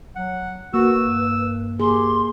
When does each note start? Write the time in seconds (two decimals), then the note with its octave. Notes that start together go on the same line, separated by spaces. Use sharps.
0.16 F#3 F#5
0.74 A#3 F#4 B4 E6
0.99 G2
1.80 A#3 G4 G#4 C6